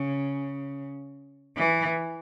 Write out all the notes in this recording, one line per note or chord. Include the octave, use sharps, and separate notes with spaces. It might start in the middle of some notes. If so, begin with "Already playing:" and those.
Already playing: C#3
E3